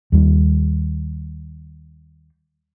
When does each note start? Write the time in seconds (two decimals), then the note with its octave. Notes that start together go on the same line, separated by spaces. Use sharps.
0.12 D#2 G3